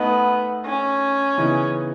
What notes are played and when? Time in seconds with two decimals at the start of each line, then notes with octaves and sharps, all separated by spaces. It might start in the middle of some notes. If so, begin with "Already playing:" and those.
Already playing: A3 B3 D#4 A4 D#5
0.65 C#4
1.38 C#3 E3 B3 D#4